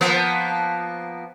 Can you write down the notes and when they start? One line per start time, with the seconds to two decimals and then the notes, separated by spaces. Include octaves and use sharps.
0.01 F3 A#3 B3